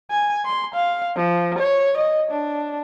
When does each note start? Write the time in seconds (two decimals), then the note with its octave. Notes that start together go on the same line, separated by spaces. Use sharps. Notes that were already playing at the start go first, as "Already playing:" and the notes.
0.11 G#5
0.46 C6
0.75 F5
1.16 F3
1.59 C#5
1.97 D#5
2.31 D4